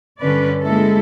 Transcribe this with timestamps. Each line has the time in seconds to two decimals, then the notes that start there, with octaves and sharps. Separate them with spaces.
0.20 G2 D3 C#4 B4 D5
0.62 G#3 A#3 E4 A4